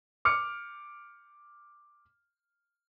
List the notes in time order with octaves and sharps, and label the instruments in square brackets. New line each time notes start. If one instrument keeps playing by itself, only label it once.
[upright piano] D6 F6 C#7